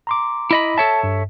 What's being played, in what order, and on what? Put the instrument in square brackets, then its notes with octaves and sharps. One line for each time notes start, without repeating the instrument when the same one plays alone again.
[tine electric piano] A#5 C6 D6
[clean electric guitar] E4 D#5 B5
[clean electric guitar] A4 C#5 E5 [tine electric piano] A5
[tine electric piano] G2